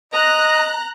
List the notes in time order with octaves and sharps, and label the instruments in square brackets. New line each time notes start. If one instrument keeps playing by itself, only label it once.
[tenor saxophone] D#5 [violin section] A#5 F#6